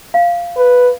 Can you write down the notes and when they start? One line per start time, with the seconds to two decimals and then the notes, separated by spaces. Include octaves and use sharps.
0.14 F5
0.57 B4